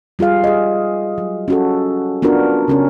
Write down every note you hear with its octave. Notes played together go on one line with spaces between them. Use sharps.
G3 F4 G#4 F5
G#4 D#5
F#3
C#4 F#4 A4
B3 D4 F4 F#4 A#4
C#3 C#4 A#4